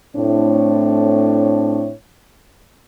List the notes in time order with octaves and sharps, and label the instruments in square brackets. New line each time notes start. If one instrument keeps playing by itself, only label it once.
[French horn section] A2 A3 C4 D4 E4 C#5